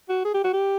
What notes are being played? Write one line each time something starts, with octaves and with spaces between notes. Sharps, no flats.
F#4
G#4
G4
F#4
G4